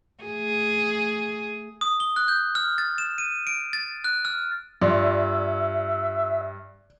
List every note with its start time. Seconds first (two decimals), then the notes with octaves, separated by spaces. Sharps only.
0.24 A3 G#4
1.81 D#6
2.00 G7
2.16 F#6
2.28 G6
2.55 F6
2.78 A6
2.98 E7
3.18 D#7
3.47 D7
3.73 A6
4.04 F#6
4.25 F6
4.82 G2 F4 D5 E5